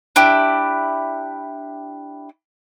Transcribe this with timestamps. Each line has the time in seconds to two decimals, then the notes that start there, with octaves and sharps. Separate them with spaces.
0.16 D4 E4 G4